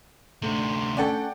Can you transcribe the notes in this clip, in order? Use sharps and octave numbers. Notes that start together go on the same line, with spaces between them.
D2 C3 A3 D4
C#4 A4 D5 F#5 G5